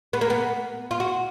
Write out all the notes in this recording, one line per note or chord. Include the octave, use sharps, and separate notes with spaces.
B3
A#3
B3
F4
F#4